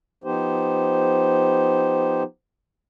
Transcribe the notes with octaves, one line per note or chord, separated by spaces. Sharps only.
F3 B3 D#4 G4 C5